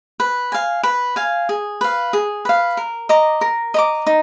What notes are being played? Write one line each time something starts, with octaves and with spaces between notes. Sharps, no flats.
B4
F5 G#5
B4
F5 G#5
G#4
B4 F5
G#4
B4 F5
A#4
D#5 A#5 D6
A#4
D#5 A#5 D6
D#4